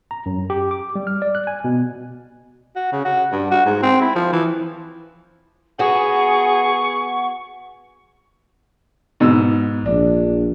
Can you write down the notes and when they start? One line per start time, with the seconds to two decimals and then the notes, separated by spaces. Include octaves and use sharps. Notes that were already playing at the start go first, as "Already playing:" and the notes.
0.11 A#5
0.26 F#2
0.50 G4
0.71 D6
0.95 G3
1.07 F6
1.22 D5
1.35 F#6
1.47 G#5
1.64 B2
2.76 F#4
2.92 C#3
3.05 F#4
3.33 G2
3.51 F#4
3.66 G#2
3.82 C4
4.01 E4
4.16 F3
4.33 E3
5.79 B3 F#4 G#4 C#6
9.20 G#2 B2 E6
9.86 A#1 D4